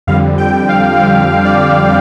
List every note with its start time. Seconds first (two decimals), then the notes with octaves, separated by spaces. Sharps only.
0.07 F2 D3 G3 F5
0.38 G5
0.69 F5
0.99 F2 D3 G3 F5
1.45 D5